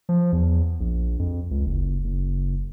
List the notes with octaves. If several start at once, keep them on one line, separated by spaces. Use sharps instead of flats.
F3
E2
A#1
F2
C#2
F#1
F#1